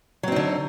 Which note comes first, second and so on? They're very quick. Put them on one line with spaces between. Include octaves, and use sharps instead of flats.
F#3 C4 D#4 D3